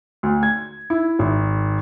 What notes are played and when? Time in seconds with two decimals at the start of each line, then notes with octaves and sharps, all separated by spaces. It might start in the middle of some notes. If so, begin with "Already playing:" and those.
0.23 D2
0.43 G#6
0.90 E4
1.19 G#1